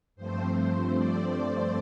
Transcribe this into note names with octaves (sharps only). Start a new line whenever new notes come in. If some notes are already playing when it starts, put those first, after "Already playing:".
G2 F3 A3 C4 C5
D5